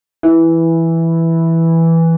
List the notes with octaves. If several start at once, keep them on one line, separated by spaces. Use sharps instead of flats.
E3